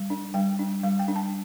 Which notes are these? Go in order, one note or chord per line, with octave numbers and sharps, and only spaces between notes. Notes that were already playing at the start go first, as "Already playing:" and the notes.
Already playing: G3
D4
G3 G5
D4
G3 F5
G5
D4
A5